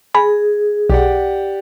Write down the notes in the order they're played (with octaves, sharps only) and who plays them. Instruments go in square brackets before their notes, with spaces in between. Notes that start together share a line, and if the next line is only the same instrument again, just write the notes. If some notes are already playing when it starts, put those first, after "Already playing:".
[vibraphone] G#4 [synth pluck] G#5 B5
[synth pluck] B1 [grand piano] G4 D5 F#5